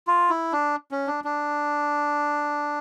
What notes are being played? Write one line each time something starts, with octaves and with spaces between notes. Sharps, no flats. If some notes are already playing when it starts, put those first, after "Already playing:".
F4
E4
D4
C#4
D4
D4